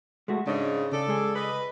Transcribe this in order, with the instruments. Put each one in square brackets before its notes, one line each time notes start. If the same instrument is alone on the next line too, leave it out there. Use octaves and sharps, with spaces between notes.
[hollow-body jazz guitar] G#3 A3 F#4
[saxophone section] G#2 C#3 [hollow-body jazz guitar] D4
[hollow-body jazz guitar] C#3 [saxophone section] A4 D5
[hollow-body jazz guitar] C#2 G#3 G#4
[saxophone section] B4 D#5